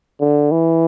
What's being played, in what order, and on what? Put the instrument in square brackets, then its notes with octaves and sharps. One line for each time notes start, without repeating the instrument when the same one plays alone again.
[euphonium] D3
E3